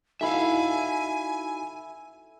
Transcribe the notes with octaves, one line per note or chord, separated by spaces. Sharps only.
D#4 E4 F#4 A4 E5 F5 G#5 B5